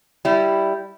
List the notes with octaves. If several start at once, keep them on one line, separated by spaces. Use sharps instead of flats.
G3 E4